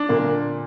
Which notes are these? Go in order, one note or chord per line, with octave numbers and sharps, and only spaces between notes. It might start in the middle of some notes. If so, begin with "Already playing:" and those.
Already playing: D4
A#2 D3 A#3